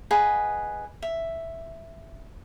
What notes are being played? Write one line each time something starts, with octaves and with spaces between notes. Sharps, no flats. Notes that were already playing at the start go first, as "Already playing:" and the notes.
G#4 B4 D#5 F#5
E5